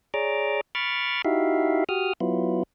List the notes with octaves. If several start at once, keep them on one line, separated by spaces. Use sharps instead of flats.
G#4 C#5 D5 A#5 D6
B5 C#6 D6 F6 A6
D#4 E4 F#4 G4 E5 F5
F#4 G4 D#6 F6
F#3 B3 E4 F4